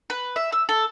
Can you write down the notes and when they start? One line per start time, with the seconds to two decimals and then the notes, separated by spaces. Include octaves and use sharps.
0.10 B4
0.36 E5
0.52 E6
0.69 A4